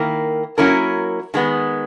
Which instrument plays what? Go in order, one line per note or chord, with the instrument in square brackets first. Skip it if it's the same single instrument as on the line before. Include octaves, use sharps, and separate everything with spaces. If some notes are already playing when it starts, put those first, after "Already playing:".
Already playing: [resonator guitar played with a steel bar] D#3 A#3 E4 A#4
F#3 A#3 C#4 E4 A#4
D#3 G#3 B3